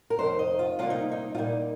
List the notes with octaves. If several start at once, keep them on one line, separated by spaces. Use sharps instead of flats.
A#4
F2 C3 D#3 C5
D#5
F4
C3 G3 A#3 F4
D#4
D#4
F4
A#2 G3 A#3 D#4